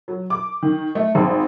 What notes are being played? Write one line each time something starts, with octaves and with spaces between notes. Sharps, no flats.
F#3
D6
D#3
A3
G#1